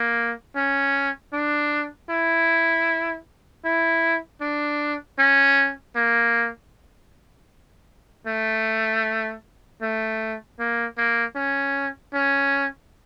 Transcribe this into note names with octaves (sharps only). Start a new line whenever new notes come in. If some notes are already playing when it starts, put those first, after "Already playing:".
Already playing: A#3
C#4
D4
E4
E4
D4
C#4
A#3
A3
A3
A#3
A#3
C#4
C#4